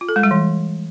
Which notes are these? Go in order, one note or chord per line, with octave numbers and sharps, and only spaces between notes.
F4
A4
G#3
G3
E3